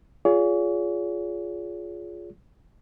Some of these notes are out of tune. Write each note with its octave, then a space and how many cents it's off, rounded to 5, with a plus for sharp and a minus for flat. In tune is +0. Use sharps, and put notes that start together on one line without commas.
F4 +0 G#4 +0 C#5 +45